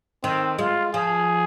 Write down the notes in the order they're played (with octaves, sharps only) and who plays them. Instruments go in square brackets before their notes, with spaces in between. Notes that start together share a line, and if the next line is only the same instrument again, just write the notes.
[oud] D#3 [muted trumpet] C4
[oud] G#3 [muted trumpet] F4
[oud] F3 [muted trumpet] G#4